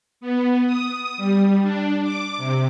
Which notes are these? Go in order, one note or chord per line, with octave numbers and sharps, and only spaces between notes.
B3
D#6
G3
D4
D6
C3